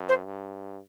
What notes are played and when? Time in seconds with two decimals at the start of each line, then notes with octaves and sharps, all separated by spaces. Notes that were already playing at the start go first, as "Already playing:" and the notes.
Already playing: F#2
0.08 C5
0.25 G2